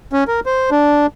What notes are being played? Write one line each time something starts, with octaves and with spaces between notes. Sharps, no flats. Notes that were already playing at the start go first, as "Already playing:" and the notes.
C#4
A#4
C5
D4